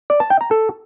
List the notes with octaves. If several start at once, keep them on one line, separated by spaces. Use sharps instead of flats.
D5
A5
G5
A#5
A4